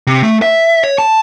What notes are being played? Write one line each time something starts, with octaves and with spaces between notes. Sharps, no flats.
C3
A3
E5
C#5
A5